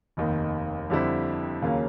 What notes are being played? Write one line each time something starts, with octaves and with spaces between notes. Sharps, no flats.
F1 D#2 D#3
F2 D3 G3 C4 E4
D#2 C#3 F#3 A#3 C#4